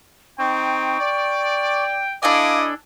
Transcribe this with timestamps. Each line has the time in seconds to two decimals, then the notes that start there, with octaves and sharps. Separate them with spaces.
0.39 C4 D#4 G5 C#6
0.99 D5
2.23 D4 E4 A4 D#5 F5 G#5 D6